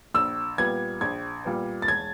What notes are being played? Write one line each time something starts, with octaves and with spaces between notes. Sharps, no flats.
A#1 E6
A#2 G3 B3 G#6
A#1 G#6
A#2 G3 B3
A6
E1 G#6